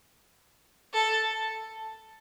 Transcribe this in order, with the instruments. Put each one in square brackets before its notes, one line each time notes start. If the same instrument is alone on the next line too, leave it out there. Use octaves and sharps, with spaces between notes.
[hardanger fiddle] A4